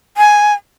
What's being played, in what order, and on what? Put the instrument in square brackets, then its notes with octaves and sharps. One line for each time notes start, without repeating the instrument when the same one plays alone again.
[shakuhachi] G#5